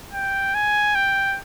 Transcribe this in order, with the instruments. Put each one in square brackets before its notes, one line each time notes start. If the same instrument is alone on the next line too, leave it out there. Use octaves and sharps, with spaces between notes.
[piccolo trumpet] G5
G#5
G5